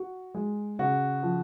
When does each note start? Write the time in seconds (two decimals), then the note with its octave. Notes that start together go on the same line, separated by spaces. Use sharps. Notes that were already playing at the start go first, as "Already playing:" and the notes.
Already playing: F#4
0.35 G#3
0.79 C#3 F#4
1.23 F3